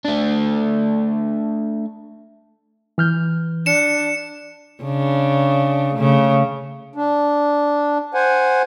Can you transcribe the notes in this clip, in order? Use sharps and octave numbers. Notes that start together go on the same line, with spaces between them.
A3 D4
E3 F6 G6
D4 C#7 E7
C#3 D4
C#3 A3
D4
C5 F#5 G#5